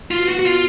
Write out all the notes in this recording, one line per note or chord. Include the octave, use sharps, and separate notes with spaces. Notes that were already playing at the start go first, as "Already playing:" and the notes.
B2 F4
F#4
F#4
F4